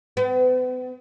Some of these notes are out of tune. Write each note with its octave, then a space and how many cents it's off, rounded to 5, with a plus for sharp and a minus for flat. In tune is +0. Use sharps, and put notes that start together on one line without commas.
B3 +40